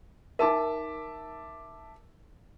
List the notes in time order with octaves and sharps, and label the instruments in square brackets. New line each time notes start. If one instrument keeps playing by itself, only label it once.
[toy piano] D#4 A#4 [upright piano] E5 A5 D6